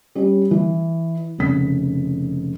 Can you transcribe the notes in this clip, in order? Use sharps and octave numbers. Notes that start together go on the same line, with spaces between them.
G3 C#4
E3
F1 C#3 B6